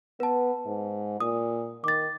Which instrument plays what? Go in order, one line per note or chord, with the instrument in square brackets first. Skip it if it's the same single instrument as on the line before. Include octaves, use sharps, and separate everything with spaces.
[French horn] B3 [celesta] B4 A5
[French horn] G#2
[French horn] A#2 [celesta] D#6
[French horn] D#3 [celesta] D6 A6